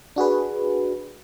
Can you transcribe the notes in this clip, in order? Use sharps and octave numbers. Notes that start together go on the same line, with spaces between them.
D4 F#4 G#4 B4